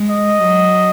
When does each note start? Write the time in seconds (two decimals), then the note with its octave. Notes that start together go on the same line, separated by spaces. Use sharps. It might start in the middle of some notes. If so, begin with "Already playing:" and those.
Already playing: G#3
0.10 D#5
0.43 F#3